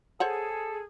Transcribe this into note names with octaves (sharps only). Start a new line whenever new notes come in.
G#4 A4 C5 C#5 F#5